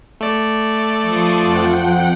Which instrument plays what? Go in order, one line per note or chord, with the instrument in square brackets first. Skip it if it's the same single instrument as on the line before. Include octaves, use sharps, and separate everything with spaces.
[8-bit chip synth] A3 D5
[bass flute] F3 [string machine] C6 C#6 D#6
[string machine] F2 F#5 G5